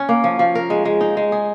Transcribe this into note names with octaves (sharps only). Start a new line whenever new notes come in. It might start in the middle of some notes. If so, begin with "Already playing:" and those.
Already playing: C#4
A#3
F3
F3
A#4
G#3
G#3
D#4
G#3
G#4